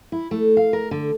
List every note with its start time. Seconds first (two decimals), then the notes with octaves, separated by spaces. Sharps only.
0.12 E4
0.31 A3
0.57 F5
0.73 A#4
0.91 D3